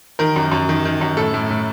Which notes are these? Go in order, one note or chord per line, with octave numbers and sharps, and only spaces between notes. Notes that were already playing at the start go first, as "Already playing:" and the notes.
D#3 A#4
F#2
F#2
D#3
D#3
F#2
A2 A4
A2
A2